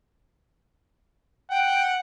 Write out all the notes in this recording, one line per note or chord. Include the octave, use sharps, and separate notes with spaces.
F#5 G5